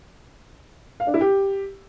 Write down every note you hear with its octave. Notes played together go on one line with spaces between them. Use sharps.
F5
D4
E4
G4